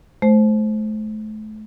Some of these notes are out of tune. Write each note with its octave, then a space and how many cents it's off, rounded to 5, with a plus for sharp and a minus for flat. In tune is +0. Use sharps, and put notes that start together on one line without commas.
A3 -35 C5 +0